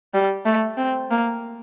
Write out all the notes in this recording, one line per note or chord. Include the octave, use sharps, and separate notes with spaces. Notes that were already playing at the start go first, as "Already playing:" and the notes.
G3
A3
C4
A#3